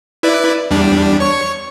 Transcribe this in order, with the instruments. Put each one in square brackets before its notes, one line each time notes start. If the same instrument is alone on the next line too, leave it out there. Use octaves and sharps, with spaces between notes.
[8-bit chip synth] E4 B4 D5
E2 G3 D4
C#5 C#6